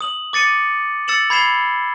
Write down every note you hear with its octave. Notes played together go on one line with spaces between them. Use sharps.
D#6 F#7
D6 A6 C#7 D#7
E6 A6 C#7 E7 F#7
B5 G#6 C7 E7 G7